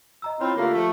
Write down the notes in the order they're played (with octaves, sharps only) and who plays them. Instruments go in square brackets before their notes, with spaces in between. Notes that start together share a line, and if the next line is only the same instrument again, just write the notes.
[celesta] D#5 A#5 E6
[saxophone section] C4 F4 [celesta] E4 C#5 B5
[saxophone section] D3 A3 A#3 [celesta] F4 G4 F5
[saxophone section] F3 A3